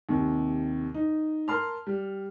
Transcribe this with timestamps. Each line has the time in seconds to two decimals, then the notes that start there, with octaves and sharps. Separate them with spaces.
0.09 D#2 C3
0.94 D#4
1.48 A#4 A5 C6 F6
1.87 G3